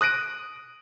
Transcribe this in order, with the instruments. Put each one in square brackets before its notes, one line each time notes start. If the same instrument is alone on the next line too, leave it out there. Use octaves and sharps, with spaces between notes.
[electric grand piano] D#6 F#6 A#6 D7 D#7